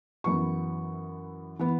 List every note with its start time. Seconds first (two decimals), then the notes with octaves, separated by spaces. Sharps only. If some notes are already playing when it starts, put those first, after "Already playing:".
0.24 F#2 E3 B3 C#6
1.59 E3 B3